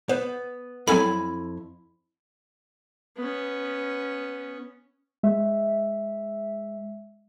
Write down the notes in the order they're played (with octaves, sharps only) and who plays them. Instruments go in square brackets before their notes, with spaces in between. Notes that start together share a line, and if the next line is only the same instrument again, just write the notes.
[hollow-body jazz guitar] B3 [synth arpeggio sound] C5
[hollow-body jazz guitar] F2 E4 G#5 [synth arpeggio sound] F#3 C4 A4 [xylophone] B5
[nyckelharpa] B3 C#4
[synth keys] G#3 E5